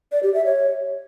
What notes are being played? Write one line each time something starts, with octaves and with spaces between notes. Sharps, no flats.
D5
G4
E5
C#5